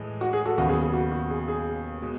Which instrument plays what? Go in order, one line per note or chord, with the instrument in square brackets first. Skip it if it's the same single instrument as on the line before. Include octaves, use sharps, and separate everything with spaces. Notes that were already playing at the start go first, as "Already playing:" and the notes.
Already playing: [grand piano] A2 E3 G#3
[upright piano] F#4
G#4
F#4 A4
[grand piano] D#2 C#3 F#3 B3 [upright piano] F#4
[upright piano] G#4
G#4
F#4
F#4
G#4
G#4
[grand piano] B2 G#3